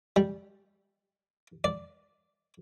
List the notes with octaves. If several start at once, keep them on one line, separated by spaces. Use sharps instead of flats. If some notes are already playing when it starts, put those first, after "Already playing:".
G3
D5